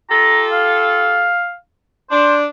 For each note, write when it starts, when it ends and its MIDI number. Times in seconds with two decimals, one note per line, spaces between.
0.10 1.31 65
0.10 1.31 67
0.10 1.31 69
0.10 0.42 82
0.52 1.54 77
2.11 2.45 62
2.11 2.35 72